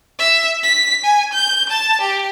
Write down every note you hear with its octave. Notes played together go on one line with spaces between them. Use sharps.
E5
B6
G#5
G6
A5
G4